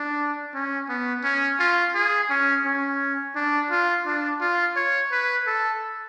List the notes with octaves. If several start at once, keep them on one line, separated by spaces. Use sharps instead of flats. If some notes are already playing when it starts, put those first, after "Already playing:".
Already playing: D4
C#4
B3
C#4
F4
G#4
C#4
C#4
D4
F4
D4
F4
C#5
B4
A4